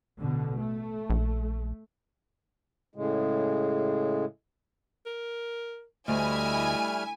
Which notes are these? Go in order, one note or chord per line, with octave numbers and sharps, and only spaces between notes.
A1 B2 D3
A3
A#1
A2 C#3 G#3
A#4
D2 G3 A3 E4 D#5 G#5 F6